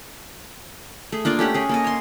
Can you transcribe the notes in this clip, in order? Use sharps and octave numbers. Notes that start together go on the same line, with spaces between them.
A3 G#4
A#3 D4 F4 D5
A3 C#4 G4 F#5
C#4 G#4
A#3 A4 D#5
C#5 C6